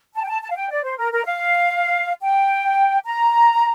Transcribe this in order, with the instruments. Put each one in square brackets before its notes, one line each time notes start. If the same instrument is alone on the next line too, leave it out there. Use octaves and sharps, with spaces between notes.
[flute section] A5
G5
A5
A5
F5
G5
D5
C5
A#4
A#4
F5
G5
A#5